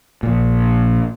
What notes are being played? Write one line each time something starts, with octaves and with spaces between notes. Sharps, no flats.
A#1 A#2